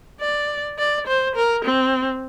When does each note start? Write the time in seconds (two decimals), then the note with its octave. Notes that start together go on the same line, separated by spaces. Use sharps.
0.21 D5
0.78 D5
1.07 C5
1.36 A#4
1.65 C4